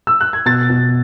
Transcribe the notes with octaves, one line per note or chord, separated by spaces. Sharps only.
E6
F#6
G#6
B2 A6
B2